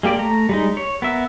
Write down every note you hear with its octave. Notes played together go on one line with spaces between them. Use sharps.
G#3 A#3 G4 D5
A3 A#5
G3 G#3 D#4
C#5
B3 A#4 E5